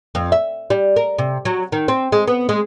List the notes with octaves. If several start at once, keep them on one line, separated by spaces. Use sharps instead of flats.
F2
E5
G3
A#4
C3
F#3
D#3
C4
G#3
B3
G#3